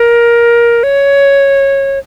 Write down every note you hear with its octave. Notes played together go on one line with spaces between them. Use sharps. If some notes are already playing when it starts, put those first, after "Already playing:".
Already playing: A#4
C#5